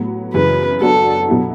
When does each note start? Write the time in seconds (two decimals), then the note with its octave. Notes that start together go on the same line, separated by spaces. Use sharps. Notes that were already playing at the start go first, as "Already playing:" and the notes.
Already playing: A2 F#3 B3
0.33 F#2 C#3 E3 B4
0.81 F#3 B3 D4 F#4 A4
1.28 B2 F#3 B3 E4